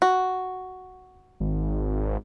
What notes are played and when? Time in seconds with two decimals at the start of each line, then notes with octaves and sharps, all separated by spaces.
0.02 F#4
1.40 G#1